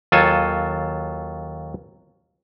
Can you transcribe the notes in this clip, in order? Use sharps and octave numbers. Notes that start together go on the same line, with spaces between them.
D#2 F#3 F4 A4 G#5 A5